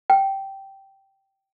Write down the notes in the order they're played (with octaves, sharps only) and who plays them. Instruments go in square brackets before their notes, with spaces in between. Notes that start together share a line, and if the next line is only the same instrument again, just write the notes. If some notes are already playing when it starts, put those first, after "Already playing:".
[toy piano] G5